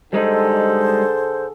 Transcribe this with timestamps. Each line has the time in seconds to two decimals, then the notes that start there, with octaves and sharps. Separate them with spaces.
0.13 D3 G3 G#3 D#4 G#4 A4 C5